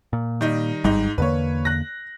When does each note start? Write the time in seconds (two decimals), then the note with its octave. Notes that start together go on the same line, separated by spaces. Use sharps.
0.13 A#2
0.41 D#3 G3 D#4
0.84 G#1 G#2 G3 D#4
1.18 E2 D3 A#3 B4 C#5
1.65 F#6 A#6